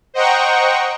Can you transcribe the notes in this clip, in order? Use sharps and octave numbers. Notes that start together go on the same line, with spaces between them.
C5 D#5 F#5 G5 A#5 C#6